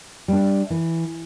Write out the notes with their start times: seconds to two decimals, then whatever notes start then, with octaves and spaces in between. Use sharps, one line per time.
0.28 G3 D4
0.70 E3